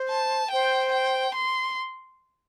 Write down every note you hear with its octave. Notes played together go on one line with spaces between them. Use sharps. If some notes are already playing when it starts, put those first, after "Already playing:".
Already playing: C5
A5
C5 G5
G5
C6